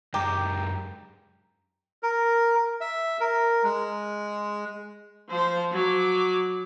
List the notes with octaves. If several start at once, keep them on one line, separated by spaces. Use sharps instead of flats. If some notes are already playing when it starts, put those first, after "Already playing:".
F#2 G#3 G4 G5 A#5
A#4
E5
A#4
G#3
F3 C5
F#3 D6